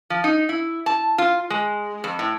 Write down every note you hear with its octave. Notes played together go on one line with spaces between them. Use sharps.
F3
D#4
E4
A5
F4
G#3
F2
A2